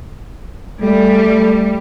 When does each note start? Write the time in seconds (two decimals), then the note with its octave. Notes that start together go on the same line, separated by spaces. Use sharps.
0.82 G3 A3